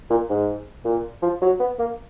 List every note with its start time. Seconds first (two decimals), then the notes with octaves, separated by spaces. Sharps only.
0.10 A#2
0.29 G#2
0.85 A#2
1.22 F3
1.42 F#3
1.60 B3
1.79 A#3